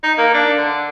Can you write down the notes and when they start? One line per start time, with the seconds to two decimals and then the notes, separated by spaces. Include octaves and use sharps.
0.03 D#4
0.18 A#3
0.34 D4
0.58 D3